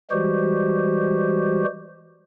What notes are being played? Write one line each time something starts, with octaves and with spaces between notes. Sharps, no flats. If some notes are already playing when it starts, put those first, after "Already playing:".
E3 G3 G#3 F#4 G4 C5